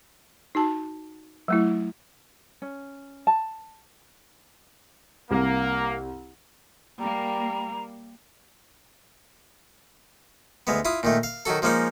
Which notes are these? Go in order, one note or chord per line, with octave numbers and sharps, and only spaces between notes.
D#4 F#4 A5
F#3 A3 E4
C#4
A5
C2 A#3
G3 A#3 A#5
D2 G#3 B3
E4 F4 D#6
A#2 D#3 A3
F5
D#3 F#3 F#4 A4
F3 G#3 A#3 C#4 D#4